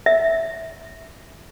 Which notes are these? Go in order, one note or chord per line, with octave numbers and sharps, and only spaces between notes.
E5